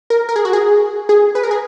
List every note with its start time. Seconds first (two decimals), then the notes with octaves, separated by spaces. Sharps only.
0.10 A#4
0.29 A#4
0.36 G#4
0.45 F#4
0.53 G#4
1.09 G#4
1.35 B4
1.43 A#4
1.51 G#4